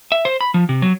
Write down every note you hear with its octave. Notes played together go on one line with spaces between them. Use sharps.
E5
C5
B5
F3
C3
F#3